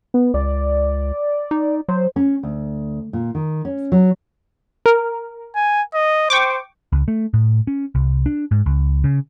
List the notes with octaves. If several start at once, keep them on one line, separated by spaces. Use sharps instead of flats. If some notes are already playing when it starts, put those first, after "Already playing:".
B3
C#2 D5
D#4
F#3 C5
C#4
D2
A#2
D#3
C#4
F#3
A#4
G#5
D#5
C5 G5 C#6 D6
C#2
A3
A2
C#4
C2
D4
G#2
C#2
C#3